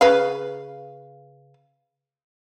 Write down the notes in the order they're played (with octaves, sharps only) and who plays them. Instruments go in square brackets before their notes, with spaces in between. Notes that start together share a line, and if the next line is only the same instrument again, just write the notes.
[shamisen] C#3 B4 F5